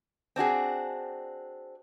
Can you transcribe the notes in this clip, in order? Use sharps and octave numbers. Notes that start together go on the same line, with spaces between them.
C4 D4 F#4 G#4